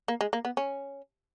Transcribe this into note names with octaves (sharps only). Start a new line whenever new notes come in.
A#3
G#3
A#3
B3
C#4